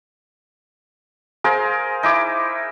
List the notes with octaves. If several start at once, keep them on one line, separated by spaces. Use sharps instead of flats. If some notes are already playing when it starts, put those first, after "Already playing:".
G#4 A#4 C5 F5
D#4 E4 D6